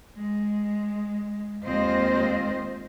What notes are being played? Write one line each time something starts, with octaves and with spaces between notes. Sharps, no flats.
G#3
D#2 G#3 C4 F4 C5 D#5